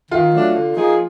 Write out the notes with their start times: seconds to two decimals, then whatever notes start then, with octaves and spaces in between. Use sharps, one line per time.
0.11 D#3 F4
0.33 F#3 A3 D4 F#4
0.54 D3
0.76 F3 A#3 D#4 G#4